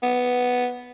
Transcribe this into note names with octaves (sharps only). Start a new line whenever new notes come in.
B3